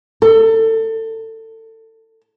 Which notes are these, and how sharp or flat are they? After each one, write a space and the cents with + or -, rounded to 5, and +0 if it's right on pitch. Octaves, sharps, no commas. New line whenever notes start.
A4 +25